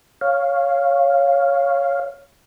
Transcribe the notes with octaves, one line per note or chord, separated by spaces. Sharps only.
C#5 F5